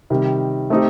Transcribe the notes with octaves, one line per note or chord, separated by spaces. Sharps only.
C3 D#3 G3
A3 C4 D#4 G4